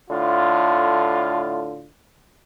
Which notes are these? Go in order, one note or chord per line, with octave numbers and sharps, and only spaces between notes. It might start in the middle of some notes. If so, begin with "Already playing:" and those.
A2 D3 F4